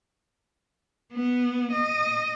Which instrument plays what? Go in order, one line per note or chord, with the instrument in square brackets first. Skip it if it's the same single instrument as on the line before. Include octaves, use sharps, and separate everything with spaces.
[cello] B3
D#5